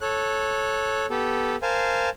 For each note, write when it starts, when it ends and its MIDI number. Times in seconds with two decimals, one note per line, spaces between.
0.01 1.06 69
0.01 1.06 73
0.01 1.06 90
1.10 1.56 59
1.10 1.56 67
1.10 1.56 69
1.62 2.10 70
1.62 2.10 72
1.62 2.10 77
1.62 2.10 80
1.62 2.10 81